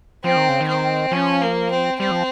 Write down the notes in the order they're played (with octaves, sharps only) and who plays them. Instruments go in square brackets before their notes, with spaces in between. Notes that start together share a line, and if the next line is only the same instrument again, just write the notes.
[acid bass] F3 [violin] C4
[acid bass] D#3
C#3
D#3
[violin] C4
[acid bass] F3 [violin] C#4
[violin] A#3
C4
[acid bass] G3 [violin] C4
[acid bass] F3